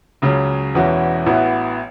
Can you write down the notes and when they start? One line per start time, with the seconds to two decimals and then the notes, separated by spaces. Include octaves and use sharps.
0.22 C#2 C#3 F#3 C#4
0.74 E1 E2 E3 C#4 F#4
1.26 A1 A2 E3 B3 F#4